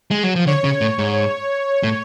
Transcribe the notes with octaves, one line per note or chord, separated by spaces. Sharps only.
G#3
F#3
F3
D3 C#5
C#3
A2
G#2
A2